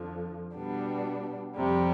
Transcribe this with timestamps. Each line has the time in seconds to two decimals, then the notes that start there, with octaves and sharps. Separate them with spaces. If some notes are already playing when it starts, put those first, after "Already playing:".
Already playing: F2 D3 F3
0.55 B2 G3 B3 D4
1.56 F2 C3 G3